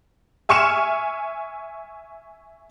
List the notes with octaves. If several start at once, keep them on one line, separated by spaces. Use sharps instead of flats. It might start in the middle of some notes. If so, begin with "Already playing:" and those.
E5 G#5 C#6 F6 C#7 E7